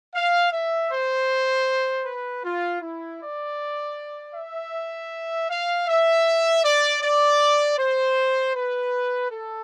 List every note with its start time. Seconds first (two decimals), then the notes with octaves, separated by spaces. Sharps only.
0.15 F5
0.53 E5
0.91 C5
2.05 B4
2.44 F4
2.82 E4
3.20 D5
4.35 E5
5.50 F5
5.88 E5
6.64 D5
7.03 D5
7.79 C5
8.55 B4
9.31 A4